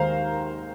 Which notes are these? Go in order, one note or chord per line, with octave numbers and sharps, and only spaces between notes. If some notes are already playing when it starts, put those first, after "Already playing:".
Already playing: D#2 D#3 G#3 C5 F5 A#5